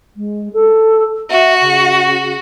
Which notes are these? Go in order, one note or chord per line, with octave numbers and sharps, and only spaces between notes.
G#3
A4
F#4 E5
C#3